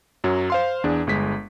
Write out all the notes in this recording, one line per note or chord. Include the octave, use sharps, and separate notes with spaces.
F#2 F#3
C5 F5 C6
E2 D4 G#4
G1 G#3 B6